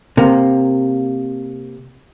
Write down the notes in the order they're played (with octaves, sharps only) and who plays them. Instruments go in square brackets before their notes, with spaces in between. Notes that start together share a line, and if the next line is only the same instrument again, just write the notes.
[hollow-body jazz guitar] C3 A#3